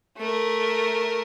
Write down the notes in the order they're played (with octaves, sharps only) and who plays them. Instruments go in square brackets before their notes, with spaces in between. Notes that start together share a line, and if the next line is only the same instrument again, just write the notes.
[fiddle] A3 A#4